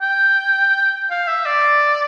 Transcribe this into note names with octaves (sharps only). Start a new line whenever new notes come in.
G5
F5
E5
D5